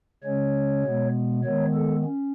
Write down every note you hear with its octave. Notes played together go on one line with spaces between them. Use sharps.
C#3 G#3 C#4 C#5
B2 G#3 B3
D#3 G#3 B3 C#5
A4
C#4